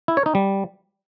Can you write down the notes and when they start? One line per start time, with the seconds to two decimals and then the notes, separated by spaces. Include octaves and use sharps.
0.08 E4
0.17 C#5
0.26 D#4
0.35 G3